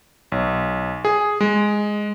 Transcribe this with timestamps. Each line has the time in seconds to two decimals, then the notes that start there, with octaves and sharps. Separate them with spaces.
0.32 B1
1.05 G#4
1.41 G#3